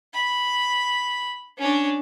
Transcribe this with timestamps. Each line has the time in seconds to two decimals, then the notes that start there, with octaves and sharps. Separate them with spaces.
0.14 B5
1.58 C#4 D4